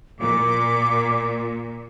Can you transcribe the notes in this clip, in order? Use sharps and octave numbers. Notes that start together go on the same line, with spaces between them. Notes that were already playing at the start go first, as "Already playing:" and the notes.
A#2 D6